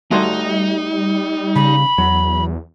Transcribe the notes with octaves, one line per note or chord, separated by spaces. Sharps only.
G3 A3 D#4 F#4 C6
C#3 B5
E2 F#3